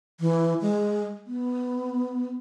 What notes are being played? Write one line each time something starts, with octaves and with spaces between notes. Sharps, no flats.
E3
G#3
B3